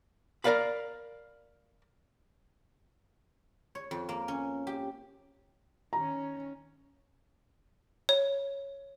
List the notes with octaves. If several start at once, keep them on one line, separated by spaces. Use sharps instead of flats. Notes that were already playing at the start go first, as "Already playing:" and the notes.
A#4 B4 D5 F5 B5
C#5
F2
A#3
C#4
G4
D#3 C#4 A#5
C#5